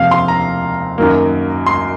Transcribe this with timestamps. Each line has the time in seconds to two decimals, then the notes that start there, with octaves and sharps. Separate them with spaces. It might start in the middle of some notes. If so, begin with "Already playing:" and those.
Already playing: F2 C3 F3 A#3 F5
0.11 C6
0.28 A#5
0.98 F#2 D#3 F#3 A#3
1.66 C6